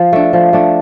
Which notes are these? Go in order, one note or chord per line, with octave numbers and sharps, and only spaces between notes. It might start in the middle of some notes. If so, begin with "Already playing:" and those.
Already playing: F3
A3 D4
F3
A3 D4